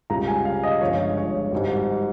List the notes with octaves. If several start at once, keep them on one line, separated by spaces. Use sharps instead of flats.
C#2 C#3 G3 A#5
G#5
F5
D#5
G1 G2 F3 G#3 C#5
C#5
G#1 G#2 G3